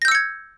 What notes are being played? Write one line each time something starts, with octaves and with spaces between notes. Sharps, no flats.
E6 G6 G#6 A#6 C#7